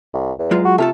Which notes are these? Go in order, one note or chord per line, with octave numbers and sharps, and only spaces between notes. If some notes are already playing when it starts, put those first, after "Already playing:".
C2
E2
F#3 G#3 F4
F#4
C3 A3 F4 A4